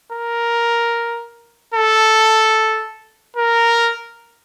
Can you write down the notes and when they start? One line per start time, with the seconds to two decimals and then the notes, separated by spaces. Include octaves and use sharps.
0.12 A#4
1.74 A4
3.36 A#4